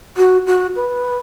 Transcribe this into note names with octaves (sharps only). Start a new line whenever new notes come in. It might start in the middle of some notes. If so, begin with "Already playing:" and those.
F#4
F#4
B4